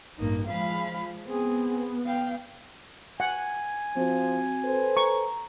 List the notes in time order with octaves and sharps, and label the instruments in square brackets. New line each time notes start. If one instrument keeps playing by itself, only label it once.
[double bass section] A1 G2 [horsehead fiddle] A#3 D#4
[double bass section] F3 G#3 [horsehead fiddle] F5 B5
[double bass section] B3 [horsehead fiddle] C4 G#4
[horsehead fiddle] F5 G5
[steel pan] F#5 [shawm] G#5
[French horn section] F3 C5 [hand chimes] C4 F#4
[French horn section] A4 B4 C5
[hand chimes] A#5 [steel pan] C#6